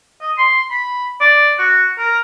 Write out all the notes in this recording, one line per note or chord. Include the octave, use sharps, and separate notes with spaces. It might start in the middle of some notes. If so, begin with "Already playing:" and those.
D#5
C6
B5
D5
F#4
A#4